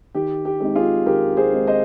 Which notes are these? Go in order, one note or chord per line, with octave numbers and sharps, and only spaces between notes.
D#3 G4
G4
G#3 C4 D#4
F4 G#4
D#3 G4 A#4
G#4 C5
G#3 C4 D#4
C5 D#5